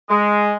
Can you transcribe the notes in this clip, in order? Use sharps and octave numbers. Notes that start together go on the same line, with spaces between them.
G#3